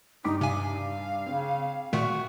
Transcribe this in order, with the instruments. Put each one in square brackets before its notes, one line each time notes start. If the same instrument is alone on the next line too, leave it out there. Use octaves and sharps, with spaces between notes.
[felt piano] G2 D6 B6 [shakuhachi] D#4
[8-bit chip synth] C3 G#5 [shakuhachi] F5
[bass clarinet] C#3 [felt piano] C4
[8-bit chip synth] A#2 D#3 A3 [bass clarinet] F#4